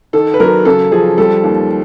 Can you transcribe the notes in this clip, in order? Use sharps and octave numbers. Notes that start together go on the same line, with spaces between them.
D#3 A4
B4
F#3 A#4
C#3 A4
F3 G#4
G3 A4
D#2